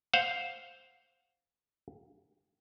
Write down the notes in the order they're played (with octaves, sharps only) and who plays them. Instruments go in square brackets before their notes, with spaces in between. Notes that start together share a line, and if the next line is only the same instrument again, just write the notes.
[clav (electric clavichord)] C5 F5 F#5